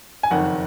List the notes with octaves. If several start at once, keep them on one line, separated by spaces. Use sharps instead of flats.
G#5
F#1 F2 D#3 F#5